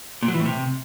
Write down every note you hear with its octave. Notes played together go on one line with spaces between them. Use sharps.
A#2
F#3
E3
A2
C3